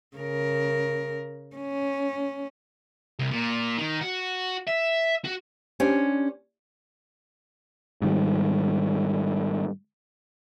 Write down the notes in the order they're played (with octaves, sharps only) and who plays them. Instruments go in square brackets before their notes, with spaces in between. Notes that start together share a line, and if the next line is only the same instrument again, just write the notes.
[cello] C#3 A#4
C#4
[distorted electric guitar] C2
A#2
D#3
F#4
E5
F#4
[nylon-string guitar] C#4 D4 G4 C5
[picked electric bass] G#2 D#3 G3